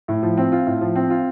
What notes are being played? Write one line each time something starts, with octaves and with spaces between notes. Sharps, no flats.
A2
F3
C4
F4
A2
F3
C4
F4